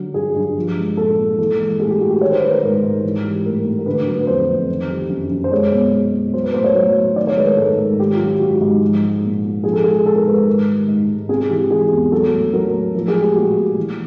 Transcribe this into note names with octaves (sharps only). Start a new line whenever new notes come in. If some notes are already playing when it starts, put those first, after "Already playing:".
Already playing: D3 F#3
G2 G#4
G2
F3
G#3
A#2 A4
A#2
E3 A4
G#3
A2 G#4
G4
A2 F#4
G4
D#3 C#5
C5
G3 B4
A#4
G#2 A#4
G#2
E3
G3
A2 A#4
A2
A#4
D3 B4
F#3
B4
F2 C5
F2
D#3
G3
F#2
F#2
C5
G#3 C#5
B2
G#3
B2
F#3 C5
B4
A2 C5
C#5
F#3
A2
D#3 D5
C#5
G#3 B4
A#4
G#2 A4
G#2
D#3 G4
F4
F#3
G4
G#2 F#4
G#2
F3
G#3
A#2
A#2
F3 G#4
A4
G#3 G#4
G#2 A4
A#4
G#2 B4
A#4
D#3
G3
G#2
G#2
C3 G#4
E3 G4
G#3 G#4
E2
F#3 A4
A2
F#3 A#4
A2
F3 A#4
G#4
G#3
G4
A#2 F#4
A#2
E3